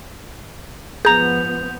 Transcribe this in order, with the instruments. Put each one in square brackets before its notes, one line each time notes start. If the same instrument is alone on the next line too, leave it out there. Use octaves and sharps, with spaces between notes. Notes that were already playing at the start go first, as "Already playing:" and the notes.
[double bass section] G#2 F3 B3 [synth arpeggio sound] G#4 A#5 [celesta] G6 F7